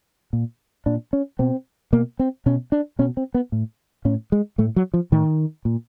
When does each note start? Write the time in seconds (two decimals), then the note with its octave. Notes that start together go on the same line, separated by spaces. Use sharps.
0.33 A#2
0.86 A#2 D4
1.13 C#4
1.39 B2 C4
1.93 B2 A#3
2.19 C4
2.46 B2 C#4
2.72 D4
2.99 B2 C#4
3.17 C4
3.34 B3
3.52 A2
4.05 A2 C#4
4.32 G#3
4.58 A2 A3
4.76 F#3
4.94 F3
5.12 A2 D#3
5.65 A#2